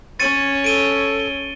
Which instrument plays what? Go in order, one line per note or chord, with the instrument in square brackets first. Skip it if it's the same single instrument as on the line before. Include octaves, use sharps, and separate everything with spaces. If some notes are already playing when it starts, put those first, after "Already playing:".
[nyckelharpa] C#4 C#5 [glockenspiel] A6 C#7 D#7
[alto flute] A4 [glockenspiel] D7 D#7 G7
[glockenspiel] G7